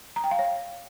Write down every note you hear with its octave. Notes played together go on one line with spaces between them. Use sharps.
A#5
G5
F5
C#5